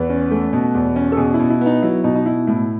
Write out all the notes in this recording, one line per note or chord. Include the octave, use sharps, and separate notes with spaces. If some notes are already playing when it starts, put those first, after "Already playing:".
Already playing: E2 B4
C#4
A3
B2
E2
C#4
A4
B2 G#4
E4
B2
E4
B3
D#4
F#3 E4
B2 D#4
D#4
B2 E4
A2 E4